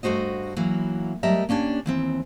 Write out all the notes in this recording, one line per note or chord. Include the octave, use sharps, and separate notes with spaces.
G2 A3 F#4 C5 D#5
E3 F#3 A#3 E4 F#4
F#3 G3 A3 A#4 D#5 E5
A#3 C#4 D4 G4
D#2 E3 C4